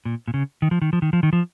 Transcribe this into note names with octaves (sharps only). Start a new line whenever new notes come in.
A#2
A#2
C#3
D#3
F3
D#3
F3
D#3
F3
D#3
F3